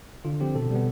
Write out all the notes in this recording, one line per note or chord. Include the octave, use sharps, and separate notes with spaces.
D3 F4
F3 C4 G4
B2 A4
G3 B3